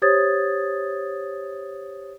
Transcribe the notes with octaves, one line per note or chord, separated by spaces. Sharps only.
G4 C5 C#5 D#6 G#6 A6